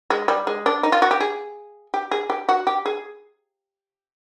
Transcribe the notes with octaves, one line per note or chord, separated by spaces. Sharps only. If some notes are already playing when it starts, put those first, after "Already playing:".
G#3
G3
G#3
D4
D#4
F4
F#4
G4
G#4
G4
G#4
G4
F#4
G4
G#4